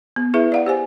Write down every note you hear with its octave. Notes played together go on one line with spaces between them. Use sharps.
B3
E4 G#4 B4 E5
D5 F5 F#5
G4 C5 G#5